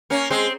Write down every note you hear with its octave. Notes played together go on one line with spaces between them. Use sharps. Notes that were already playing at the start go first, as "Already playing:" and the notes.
A#3 C#4
G#3 C4